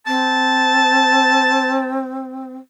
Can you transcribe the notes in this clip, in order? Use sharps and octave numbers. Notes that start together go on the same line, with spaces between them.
C4 A5